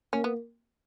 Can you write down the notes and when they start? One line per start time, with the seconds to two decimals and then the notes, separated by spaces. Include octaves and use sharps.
0.13 A#3 C#4
0.24 B3